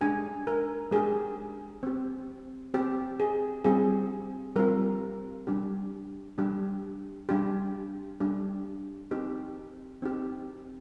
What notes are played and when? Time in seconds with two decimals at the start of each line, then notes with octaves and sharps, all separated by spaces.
0.01 G#3 D4 G4 G#5
0.47 A#4
0.91 G#3 D4 G4 G#4
1.83 C4 G4
2.74 C4 G4
3.20 G#4
3.64 G3 C4 F4 G#4
4.56 G3 C4 F4 A#4
5.47 G3 D4 G4
6.38 G3 D4 G4
7.29 G3 D4 G4
8.20 G3 D4 G4
9.11 C4 D#4 G4
10.02 C4 D#4 G4